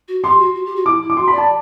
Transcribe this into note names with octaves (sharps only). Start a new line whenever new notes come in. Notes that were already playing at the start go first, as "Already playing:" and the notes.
F#4
G4 C6
F#4
F#4
G4
F#4
E4 D6
E4
D6
F#4 C6
B5
D5
A5